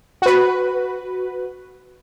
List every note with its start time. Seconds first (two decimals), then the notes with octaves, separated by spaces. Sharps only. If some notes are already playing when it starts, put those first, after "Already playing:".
0.22 F#4 B4